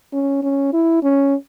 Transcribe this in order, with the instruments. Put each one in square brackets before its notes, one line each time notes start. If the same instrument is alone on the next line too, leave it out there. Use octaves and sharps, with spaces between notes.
[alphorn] C#4
C#4
E4
C#4